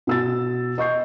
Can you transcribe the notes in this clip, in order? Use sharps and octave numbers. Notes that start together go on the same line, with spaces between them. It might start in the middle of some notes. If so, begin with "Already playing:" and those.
B2 E6 A6
D#5 C#6 G6 C7